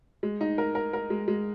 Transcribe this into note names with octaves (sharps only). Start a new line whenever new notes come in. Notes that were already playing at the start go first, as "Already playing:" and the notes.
G#3
D#4
A#4
A#4
A#4
G#3
G#3